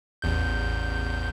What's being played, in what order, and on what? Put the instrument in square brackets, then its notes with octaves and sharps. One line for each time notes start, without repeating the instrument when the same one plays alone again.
[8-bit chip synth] A1 E2 G6